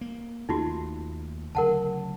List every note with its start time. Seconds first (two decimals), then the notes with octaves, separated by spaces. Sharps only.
0.01 A#3
0.49 D#2 A3 A#3 D#4 F4 F#4
1.55 D2 C#3 F#3 A#4 F#5 A5